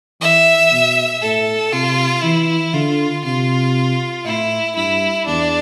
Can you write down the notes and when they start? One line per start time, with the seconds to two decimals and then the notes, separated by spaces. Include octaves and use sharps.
0.21 E3 E5
0.72 B2
1.22 A2 A4
1.73 C3 F4
2.23 E3 E4
2.74 D3 F4
3.25 C3 F4
4.25 A2 E4
4.76 G2 E4
5.26 E2 D4